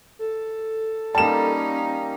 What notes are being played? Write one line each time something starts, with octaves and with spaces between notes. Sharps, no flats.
A4
G3 A#3 C#4 D#4 A5 E7